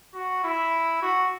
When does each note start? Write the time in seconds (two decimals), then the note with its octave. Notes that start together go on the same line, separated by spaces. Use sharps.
0.14 F#4
0.44 E4
1.02 F#4